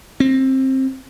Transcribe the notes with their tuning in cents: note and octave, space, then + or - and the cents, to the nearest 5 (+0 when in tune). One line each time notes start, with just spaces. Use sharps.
C4 +20